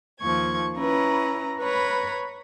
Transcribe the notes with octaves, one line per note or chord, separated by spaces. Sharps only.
D#2 F3 C#6 G#6
C#4 E4 B4 A#5
B4 C#5 A#5 B5